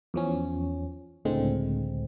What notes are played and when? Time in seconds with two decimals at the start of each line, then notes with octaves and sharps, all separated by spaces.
0.14 E2 F3 C#4
1.25 C#2 A2 D3 G#3 C4